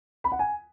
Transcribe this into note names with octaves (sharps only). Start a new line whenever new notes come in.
B5
F#5
G#5